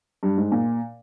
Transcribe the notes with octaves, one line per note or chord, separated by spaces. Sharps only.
G2
G#2
A#2